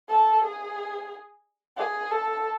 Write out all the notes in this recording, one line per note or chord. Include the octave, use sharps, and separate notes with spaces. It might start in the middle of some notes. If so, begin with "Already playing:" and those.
A4
G#4
G#4
A4